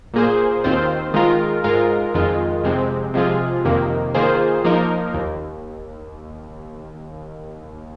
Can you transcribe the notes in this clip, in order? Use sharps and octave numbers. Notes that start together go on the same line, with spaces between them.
A#2 A#3 G#4 C5
D#2 D#3 C4 F4 C5
D#3 G#3 F4 A#4
G#2 G#3 F4 A#4
F2 D#3 G#3 F4
F2 C3 G#3 C4
C3 F3 G#3 F4 G#4
F2 C3 D#3 A#3
D#3 A#3 F4 G#4 C5
F3 A#3 D#4 A#4
D#2